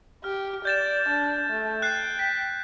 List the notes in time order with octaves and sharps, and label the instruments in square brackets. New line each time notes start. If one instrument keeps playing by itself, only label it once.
[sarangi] G4 [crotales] F6
[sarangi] D5 [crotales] G6 A6 E7
[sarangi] D4
A3
[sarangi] G5 [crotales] F#6 G6 C7
[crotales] B6